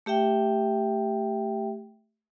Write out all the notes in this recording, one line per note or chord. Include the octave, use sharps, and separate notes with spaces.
A3 G4 E5 G5